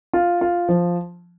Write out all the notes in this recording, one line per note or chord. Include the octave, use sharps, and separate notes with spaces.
F4
F4
F3